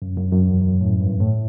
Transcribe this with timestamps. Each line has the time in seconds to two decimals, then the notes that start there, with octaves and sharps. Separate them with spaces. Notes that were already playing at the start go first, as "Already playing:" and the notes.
0.02 F#2
0.17 F#2
0.32 F#2
0.47 E2
0.62 F#2
0.81 A2
1.00 G2
1.20 A2